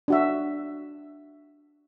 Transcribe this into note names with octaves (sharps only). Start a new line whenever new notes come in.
D4 F#4 E5